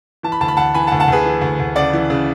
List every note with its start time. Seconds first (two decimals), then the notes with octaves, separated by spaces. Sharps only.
0.23 E3 A5
0.32 B5
0.41 D2 A5
0.48 B5
0.57 D2 F#5 A5
0.74 E3 G#5 B5
0.87 F#5 A5
0.92 D2
1.00 F#5 A5
1.08 D2 G#4 B4
1.25 E3
1.41 D2
1.59 D2
1.76 C#3 D5 F#5
1.93 E3
2.10 C#3